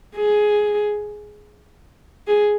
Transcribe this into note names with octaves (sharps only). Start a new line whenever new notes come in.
G#4
G#4